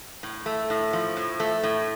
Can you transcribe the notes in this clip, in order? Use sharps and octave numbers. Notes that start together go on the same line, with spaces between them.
A2
A3
A2
F3
A2
A3
A2